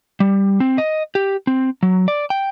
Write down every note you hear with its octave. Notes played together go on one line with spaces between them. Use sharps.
G3
C4
D#5
G4
C4
F#3
D5
G5